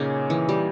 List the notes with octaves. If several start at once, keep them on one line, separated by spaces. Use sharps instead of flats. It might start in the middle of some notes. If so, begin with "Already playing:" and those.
Already playing: A#2 C#3 A#3 C#4 D#4 G#4
E3
G3